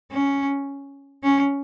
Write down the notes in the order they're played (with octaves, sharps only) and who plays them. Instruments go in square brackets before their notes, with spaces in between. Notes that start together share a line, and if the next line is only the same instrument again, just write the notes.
[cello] C#4
C#4